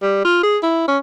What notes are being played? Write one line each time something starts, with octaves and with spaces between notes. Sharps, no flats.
G3
F4
G#4
E4
C#4